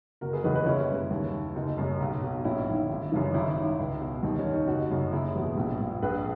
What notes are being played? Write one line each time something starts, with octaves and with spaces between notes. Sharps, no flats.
F#1 F#4 A#4
G#4 B4
E2 C#3 E3 B4 D#5
B4 D#5
F#1 C#4 E4
F#2 C#3
D#2
D#3
F#1 D#4
F#2 C#3
B1
B2
A#1 C#4 E4
G#2 D#3
G#1
F#2 C#3 E3
G#1 C#4 E4
G#2 D#3
C#2
B2
D#2 D#4
C#4
D#3
D#4
F#1 D#4 F#4
F#2 C#3
F#1 E4 G#4
E2 B2
A#1
A#2
A#1 G#4 B4